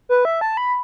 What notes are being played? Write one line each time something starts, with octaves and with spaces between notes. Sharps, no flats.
B4
E5
A5
B5